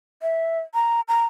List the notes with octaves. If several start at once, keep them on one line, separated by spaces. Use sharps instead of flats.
E5
A#5
A#5